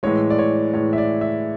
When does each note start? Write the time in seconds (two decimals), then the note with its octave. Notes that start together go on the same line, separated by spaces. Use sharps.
0.03 A2 E3 G#3 C#5
0.30 D5
0.39 C#5
0.73 A2 E3 G#3 C#5
0.93 E5
0.98 D5
1.21 E5